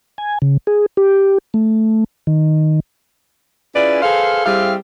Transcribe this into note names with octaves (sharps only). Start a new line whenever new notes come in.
G#5
C#3
G#4
G4
A3
D#3
C#4 E4 F4 G#4 B4 D5
G#4 A4 B4 C5 F5
G3 C4 E4 G4 G#4 F5